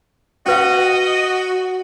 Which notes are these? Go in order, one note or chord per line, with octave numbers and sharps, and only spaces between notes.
C#4 F#4 B4 D#5 F5